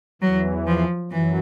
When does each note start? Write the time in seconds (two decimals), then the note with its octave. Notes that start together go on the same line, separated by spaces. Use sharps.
0.22 E2 E3 F#3
0.67 F3
1.11 F#2 E3 F#3